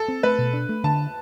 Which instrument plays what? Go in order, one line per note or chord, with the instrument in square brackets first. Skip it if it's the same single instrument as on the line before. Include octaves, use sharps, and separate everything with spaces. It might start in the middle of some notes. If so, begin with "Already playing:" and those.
Already playing: [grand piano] A4
[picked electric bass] C4
[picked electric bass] A3 [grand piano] B4
[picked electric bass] B2
D4
A3
[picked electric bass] D3 [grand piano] A5